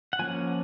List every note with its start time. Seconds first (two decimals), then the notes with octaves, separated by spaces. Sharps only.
0.13 F#5
0.19 F3 A#3 C#4 G#5